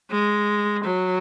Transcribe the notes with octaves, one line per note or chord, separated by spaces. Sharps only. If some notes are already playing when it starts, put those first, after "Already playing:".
G#3
F#3